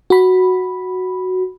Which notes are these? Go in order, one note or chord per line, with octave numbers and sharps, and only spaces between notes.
F#4 B5